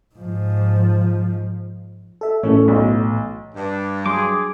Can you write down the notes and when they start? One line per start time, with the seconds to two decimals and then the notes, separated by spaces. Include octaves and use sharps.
0.15 G#2 F3
2.21 A4 E5
2.43 A2 E3 A3 C#4 A4
2.68 B1
3.55 G2 D4
4.06 F#3 G#4 C6 D6